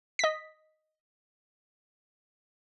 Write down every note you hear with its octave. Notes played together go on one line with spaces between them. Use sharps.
D#5 B6